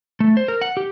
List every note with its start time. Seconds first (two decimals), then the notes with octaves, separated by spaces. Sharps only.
0.20 A3
0.37 C5
0.48 A#4
0.62 F#5
0.77 G4